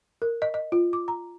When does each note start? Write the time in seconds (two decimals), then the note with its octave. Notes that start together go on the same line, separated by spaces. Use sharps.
0.22 A#4
0.42 D#5
0.54 D#5
0.72 F4
0.93 D6
1.08 A#5